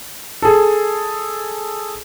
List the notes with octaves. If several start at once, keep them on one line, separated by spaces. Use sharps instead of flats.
G#4 A4